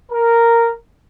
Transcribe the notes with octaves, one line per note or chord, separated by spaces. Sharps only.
A#4